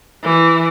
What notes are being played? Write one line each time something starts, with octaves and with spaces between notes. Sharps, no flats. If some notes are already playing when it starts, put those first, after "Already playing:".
E3